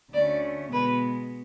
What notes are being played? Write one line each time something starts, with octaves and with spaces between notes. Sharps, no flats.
D2 D3 A3 C#4 D5
B2 G#3 B3 B4